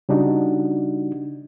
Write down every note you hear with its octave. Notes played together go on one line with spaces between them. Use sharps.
C#3 G3 D4 D#4 F#4